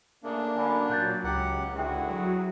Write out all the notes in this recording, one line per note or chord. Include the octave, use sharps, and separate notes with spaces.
A#2 C#3 A3 A#3 D4
F#2 D3 F5 G#5 B5
A#2 F#3 F#6 G6 A6
C#2 G4 F#5 A#5
D3 E4 F#4 G#4 F#5 G5
F#3